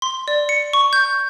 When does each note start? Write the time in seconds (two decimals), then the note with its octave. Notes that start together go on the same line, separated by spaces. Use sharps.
0.02 C6
0.28 D5
0.49 C#7
0.73 C#6
0.93 G6